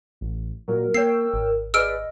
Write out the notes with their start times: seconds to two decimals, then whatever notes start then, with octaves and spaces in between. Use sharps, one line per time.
0.21 A1
0.68 A#2 F#3 A#4
0.94 A#3 C#5 G5 E6 C7
1.34 G#1
1.74 G#4 B4 D5 D#5 E6 F6 D7